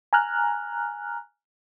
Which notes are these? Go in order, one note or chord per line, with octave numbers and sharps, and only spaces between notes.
G#5 A#5 F6 F#6